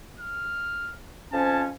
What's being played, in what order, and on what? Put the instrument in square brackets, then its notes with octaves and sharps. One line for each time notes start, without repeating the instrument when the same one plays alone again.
[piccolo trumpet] F6
[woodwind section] F2 F3 C#4 [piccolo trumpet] A5